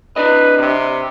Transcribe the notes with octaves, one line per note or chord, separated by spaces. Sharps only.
D4 B4 D5 D#5
C3